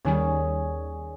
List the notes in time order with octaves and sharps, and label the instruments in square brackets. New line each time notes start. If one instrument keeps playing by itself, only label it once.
[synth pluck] D#2 D#3 G3 [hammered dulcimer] C#4 G#4